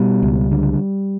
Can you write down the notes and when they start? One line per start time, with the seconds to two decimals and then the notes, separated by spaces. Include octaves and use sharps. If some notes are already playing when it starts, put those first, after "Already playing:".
Already playing: B2 G3
0.23 C#2
0.52 D3